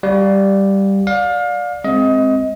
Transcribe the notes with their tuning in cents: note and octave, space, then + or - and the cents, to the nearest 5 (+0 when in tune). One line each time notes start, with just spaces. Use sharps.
G3 +0 D5 +0 F5 +20
D5 +0 F5 +30
G#3 +0 C4 +0 D#5 +25